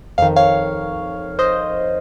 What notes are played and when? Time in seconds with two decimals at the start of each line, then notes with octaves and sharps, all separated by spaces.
0.18 F2 D#3 F5
0.36 C#5 F5
1.39 C5 D#5